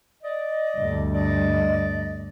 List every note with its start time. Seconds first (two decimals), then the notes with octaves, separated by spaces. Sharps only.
0.23 D5 D#5
0.78 D2 G2
1.14 D5 D#5